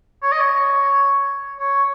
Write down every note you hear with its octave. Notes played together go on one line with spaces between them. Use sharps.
C#5
D#5
C#5
C#5